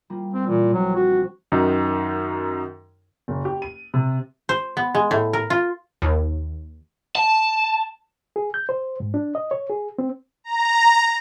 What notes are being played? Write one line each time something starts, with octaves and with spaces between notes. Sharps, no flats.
G3 A#3 F4
C4
A#2 E3
A#1 F#3 C4
F#4
D4
F#2 D#3 D#4
F#1
G4
D#7
C3
C5
B3
G#3
A2
A#4
F4
D#2
A5
G#4
G6
C5
G#2
D4
D#5
C#5
G#4
C4
A#5